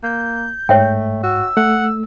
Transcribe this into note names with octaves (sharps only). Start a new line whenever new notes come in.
A#3 G6
G#2 A3 C#5 E5 G5
F#4 E6
A3 F#5